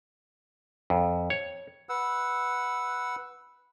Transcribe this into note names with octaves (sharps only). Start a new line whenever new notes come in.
F2
C#5
B4 F#5 E6